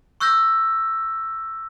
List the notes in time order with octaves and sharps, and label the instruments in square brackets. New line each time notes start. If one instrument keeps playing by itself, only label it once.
[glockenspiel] C#6 E6 F#6 G6 A#6